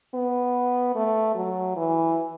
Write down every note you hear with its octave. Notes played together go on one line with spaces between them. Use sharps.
B3
A3
F#3
E3